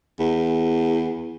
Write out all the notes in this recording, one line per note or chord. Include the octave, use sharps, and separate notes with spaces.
E2